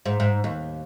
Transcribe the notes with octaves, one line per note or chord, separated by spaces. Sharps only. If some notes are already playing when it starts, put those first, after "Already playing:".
G#2
G#2
D#2